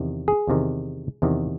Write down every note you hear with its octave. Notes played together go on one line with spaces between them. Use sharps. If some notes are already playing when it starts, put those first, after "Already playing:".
Already playing: E2 C3 D#3
G#4
E2 C3 D#3
E2 C3 D#3